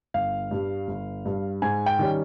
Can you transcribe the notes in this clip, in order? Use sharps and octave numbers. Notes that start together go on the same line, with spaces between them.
G1 F5
G2 G3
G1
G2 G3
G#2 G#5
G5
D#3 G3 C#4